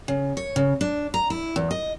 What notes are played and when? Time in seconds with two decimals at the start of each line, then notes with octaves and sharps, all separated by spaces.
0.08 C#3
0.37 C#5
0.56 C#3
0.81 D4
1.14 A#5
1.30 E4
1.56 E2
1.71 D#5